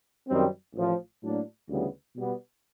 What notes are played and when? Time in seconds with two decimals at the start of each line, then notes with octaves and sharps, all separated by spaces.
0.28 F#2 D#3 G3 C4
0.75 A1 A2 F3
1.23 A2 F#3 A#3 D4
1.69 D2 C#3 E3 G3 B3
2.16 B2 G3 B3